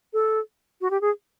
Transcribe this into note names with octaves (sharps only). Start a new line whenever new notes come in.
A4
F#4
G4
G#4